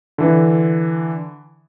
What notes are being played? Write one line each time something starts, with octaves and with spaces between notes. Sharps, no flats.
D3 E3